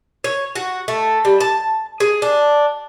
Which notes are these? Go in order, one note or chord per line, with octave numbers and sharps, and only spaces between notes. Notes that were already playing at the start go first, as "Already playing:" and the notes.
C#5
F#4
A3
G3
A5
G#4
D4